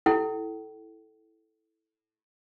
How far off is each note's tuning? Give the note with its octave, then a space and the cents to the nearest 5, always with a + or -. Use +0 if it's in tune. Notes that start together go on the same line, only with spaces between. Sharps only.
E4 -10 A4 -10 G5 -40